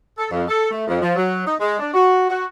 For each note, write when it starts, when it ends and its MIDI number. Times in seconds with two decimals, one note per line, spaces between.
0.18 0.27 69
0.31 0.43 41
0.48 0.71 69
0.71 0.85 57
0.87 1.01 41
1.02 1.14 53
1.16 1.43 54
1.46 1.54 63
1.59 1.79 56
1.79 1.91 62
1.93 2.26 66
2.29 2.45 66